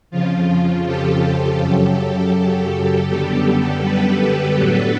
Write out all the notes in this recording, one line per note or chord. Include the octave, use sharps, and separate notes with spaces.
F2 C#3 F3 F4
G4 A4
F#2 C#3 F#3
G4 A4
F#2 D3 G3 B3
A4 B4
A2 F#3 B3 D4